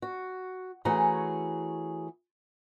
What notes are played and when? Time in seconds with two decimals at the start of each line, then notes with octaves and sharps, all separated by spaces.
0.02 F#4
0.85 E3 A3 C#4 F#4 G#4 A#5